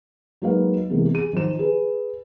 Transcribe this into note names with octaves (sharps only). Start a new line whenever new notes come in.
F#3 G#3 A#3 D#4 B4 F5
C3 E3 G#3 A#3 B3
G#4 D#7
D#3 F3 C5 E7
G#4 B4